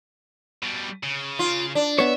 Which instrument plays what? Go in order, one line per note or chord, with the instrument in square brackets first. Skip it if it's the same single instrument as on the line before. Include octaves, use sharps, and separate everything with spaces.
[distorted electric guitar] B2 G3
C#3
[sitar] F4
D4
[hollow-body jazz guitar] B3 C#5 [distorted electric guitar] E5